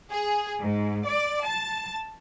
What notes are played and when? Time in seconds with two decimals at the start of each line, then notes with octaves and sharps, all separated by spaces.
0.12 G#4
0.61 G#2
1.06 D5
1.45 A5